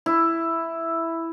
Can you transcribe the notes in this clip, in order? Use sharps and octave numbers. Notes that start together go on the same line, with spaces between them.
E4